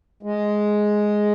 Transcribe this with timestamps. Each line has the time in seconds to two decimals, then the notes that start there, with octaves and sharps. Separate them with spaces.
0.23 G#3